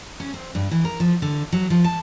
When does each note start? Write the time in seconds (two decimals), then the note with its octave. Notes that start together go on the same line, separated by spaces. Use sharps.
0.20 C#4
0.34 C4
0.55 G2
0.71 E3
0.85 A#4
1.00 F3
1.22 D3
1.53 F#3
1.70 F3
1.84 A5